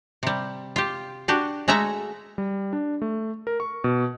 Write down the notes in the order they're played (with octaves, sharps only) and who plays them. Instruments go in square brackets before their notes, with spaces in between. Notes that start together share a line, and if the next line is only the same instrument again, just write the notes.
[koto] C3 G3
F4 G4
D4 F#4 G4
G#3 A3 F#4 A4 E5 A#5
[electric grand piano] G3
D4
A3
A#4
C#6
B2